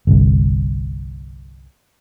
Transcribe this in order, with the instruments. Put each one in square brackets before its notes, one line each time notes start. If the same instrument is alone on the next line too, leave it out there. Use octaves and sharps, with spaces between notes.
[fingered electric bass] G1 C2